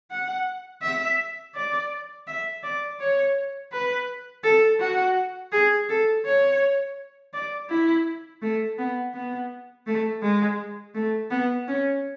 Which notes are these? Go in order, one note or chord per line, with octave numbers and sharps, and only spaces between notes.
F#5
E5
D5
E5
D5
C#5
B4
A4
F#4
G#4
A4
C#5
D5
E4
A3
B3
B3
A3
G#3
A3
B3
C#4